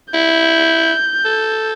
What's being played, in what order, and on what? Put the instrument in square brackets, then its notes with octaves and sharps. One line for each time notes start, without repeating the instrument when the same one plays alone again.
[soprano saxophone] E4 [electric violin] G6
[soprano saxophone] A4